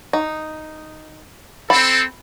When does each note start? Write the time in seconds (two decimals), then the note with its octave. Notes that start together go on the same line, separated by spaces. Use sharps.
0.13 D#4
1.70 C4 A4 B5